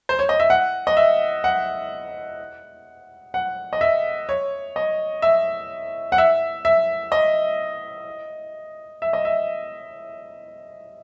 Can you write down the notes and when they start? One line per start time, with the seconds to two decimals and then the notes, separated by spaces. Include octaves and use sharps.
0.09 C5
0.19 C#5
0.29 D#5
0.40 E5
0.50 F#5
0.87 D#5
0.97 E5
1.44 F#5
3.34 F#5
3.73 D#5
3.81 E5
4.29 C#5
4.76 D#5
5.22 E5
6.12 F#5
6.18 E5
6.65 E5
7.12 D#5
9.02 E5
9.13 D#5
9.25 E5